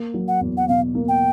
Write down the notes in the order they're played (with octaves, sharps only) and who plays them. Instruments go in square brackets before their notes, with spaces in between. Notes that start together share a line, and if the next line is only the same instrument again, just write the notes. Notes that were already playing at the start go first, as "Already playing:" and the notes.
Already playing: [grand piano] A#3
F#3
[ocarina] F#5
[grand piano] E2
[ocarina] F#5
[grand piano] B2 [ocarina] F5
[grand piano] A#3
[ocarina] G5